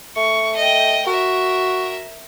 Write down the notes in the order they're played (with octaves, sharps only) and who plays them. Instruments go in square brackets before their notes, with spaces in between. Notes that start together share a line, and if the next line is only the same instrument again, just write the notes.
[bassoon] A3 [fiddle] C#6
[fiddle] D#5 G5
[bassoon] F#4 [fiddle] A#4 E5